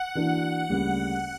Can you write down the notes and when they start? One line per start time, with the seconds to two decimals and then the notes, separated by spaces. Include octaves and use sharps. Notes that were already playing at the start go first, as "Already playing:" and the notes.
Already playing: F#5
0.15 E3 A#3 D4 F#4
0.70 D2 C#3 G3 A#3